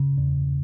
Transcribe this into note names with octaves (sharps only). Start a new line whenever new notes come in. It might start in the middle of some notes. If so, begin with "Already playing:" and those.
Already playing: C#3
E2